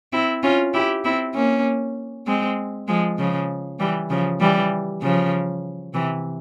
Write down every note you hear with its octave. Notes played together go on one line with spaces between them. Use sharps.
C4 E4
C#4 F4
E4 G4
C4 E4
A#3 C#4
G#3 C4
F3 G#3
C#3 F3
E3 G3
C#3 F3
E3 G3
C#3 F3
C3 E3